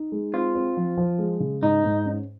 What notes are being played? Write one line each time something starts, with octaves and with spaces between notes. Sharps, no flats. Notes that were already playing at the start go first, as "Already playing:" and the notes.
Already playing: D#4
G#3
C4 F4
C4
F3
F3
G#3
C#3
G#2 D#4
G#2
C#4